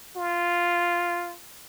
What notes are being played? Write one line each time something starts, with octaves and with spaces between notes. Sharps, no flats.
F4